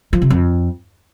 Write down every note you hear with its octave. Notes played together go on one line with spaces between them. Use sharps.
F3
C3
F2